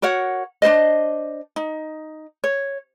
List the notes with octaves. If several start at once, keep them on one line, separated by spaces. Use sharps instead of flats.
F#4 A#4 C#5 F#5
D4 D#4 C5 D#5
D#4
C#5